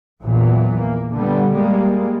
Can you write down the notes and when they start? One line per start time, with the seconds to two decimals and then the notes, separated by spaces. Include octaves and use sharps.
0.24 A#1 E2 A#2 E3 F#3
0.78 A#3
1.12 D3 G3 B3
1.55 G3 G#3 A#3